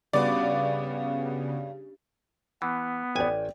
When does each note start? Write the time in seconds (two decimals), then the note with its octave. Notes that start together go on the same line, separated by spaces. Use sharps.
0.13 G2 C#3 G3 B3 F#4 D5
2.62 E3 B3
3.16 A1 D5 G5 G#5